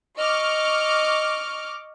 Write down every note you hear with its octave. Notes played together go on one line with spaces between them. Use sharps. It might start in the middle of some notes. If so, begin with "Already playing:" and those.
D#5 C#6 D6 F6